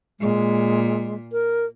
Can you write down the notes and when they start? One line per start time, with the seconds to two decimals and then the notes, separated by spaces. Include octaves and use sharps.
0.20 A#2 G#3
1.32 A#4